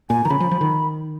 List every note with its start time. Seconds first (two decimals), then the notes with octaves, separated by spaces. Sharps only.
0.10 A#2 G#5
0.25 D#3 A#5
0.30 C#3 B5
0.40 F3
0.51 F3
0.61 D#3